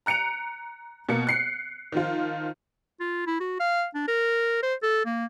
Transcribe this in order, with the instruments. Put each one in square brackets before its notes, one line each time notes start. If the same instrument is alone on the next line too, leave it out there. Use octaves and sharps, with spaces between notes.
[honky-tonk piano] A#5 F#6 C#7 D7 F7
B2 A#3 C#7
F#6 C7 C#7
D#3 F3 F4
[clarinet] F4
E4
F#4
F5
D4
A#4
C5
A4
A#3